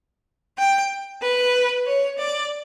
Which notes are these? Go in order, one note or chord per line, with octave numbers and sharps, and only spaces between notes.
G5
B4
C#5
D5